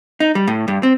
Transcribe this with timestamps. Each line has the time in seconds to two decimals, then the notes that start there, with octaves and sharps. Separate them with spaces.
0.20 D#4
0.35 G3
0.47 A2
0.68 G2
0.83 C4